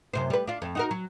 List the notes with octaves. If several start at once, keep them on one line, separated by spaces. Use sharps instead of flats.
F#2 C3 C5
G3 B4
D4 F4
F2
D#4 F#4 A#4
F#3